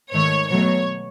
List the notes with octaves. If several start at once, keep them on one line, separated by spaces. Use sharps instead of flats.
G#2 D#3 A3 C#5
B2 F#3 A3 C#5